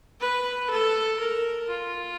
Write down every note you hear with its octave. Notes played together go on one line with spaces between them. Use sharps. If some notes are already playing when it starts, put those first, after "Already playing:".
B4
A4
A#4
F4